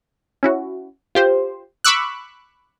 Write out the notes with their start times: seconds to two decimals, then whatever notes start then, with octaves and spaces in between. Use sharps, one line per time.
0.43 C#4 E4 F#4
1.15 F4 G4 C5
1.84 B5 C#6 D6 E6 F#6